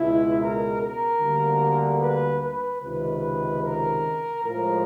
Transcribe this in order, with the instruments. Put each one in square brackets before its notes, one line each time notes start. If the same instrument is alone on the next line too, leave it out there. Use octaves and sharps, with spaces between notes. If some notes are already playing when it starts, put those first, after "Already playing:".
Already playing: [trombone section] C#2 B2 G#3 E4
A#4
A#4
D2 D3 G3 A#3
B4
B4
C#2 C3 D#3 B4
A#4
A2 F3 G#3 A#4